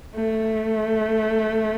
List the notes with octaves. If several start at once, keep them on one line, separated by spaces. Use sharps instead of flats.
A3